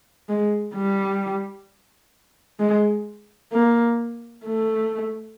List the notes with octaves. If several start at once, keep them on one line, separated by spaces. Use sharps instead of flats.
G#3
G3
G#3
A#3
A3